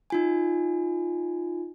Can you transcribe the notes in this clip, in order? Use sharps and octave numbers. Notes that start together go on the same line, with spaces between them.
D#4 F4 G#5